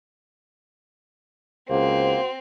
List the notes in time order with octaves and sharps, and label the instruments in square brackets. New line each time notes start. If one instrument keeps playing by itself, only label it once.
[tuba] C#2 [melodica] A#3 [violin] C4 [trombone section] F#4 C5